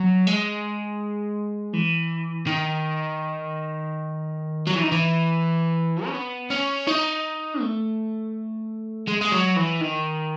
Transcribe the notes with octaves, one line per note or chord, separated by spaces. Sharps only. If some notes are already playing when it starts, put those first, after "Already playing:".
Already playing: F#3
G#3
E3
D#3
F#3
E3
D#3
E3
C#4
B3
C#4
D#4
A3
G#3
G#3
F#3
E3
D#3